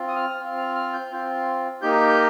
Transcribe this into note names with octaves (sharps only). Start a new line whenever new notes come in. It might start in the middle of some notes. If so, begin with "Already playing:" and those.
Already playing: C4 F4
D#6
F6
C4 F4
F6
F6
G6
C4 F4
A#3 D#4 G4 G6